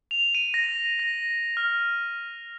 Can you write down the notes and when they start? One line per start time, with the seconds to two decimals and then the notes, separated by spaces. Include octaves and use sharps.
0.11 F7
0.35 D#7
0.54 A#6
0.99 A#6
1.57 F6